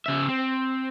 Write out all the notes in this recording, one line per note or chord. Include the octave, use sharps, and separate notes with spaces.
C#3 E5
C4